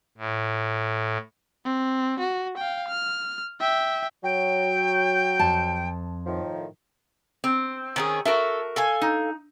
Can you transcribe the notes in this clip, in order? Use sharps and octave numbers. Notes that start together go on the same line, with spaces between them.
A2
C4
F#4
F5 G5
F6
E5 G5
F#3 G5
F2 A5
A2 D#3 F3
C4
D#3 C#4 G#4
F#4 A4 A#4 E5
A4 F5 G#5
D#4